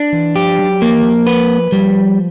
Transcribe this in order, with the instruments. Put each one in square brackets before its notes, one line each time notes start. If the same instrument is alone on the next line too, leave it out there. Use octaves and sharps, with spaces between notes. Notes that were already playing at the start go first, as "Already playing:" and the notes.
Already playing: [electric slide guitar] D4
[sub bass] E3
[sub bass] F3 [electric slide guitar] G4
[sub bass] F#3
[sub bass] F3 [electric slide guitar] A#3
[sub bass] E3
F3
[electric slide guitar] B4
[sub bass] F3 [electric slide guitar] G3